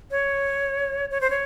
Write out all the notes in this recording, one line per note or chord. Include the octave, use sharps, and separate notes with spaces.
C#5
C#5
C5
C#5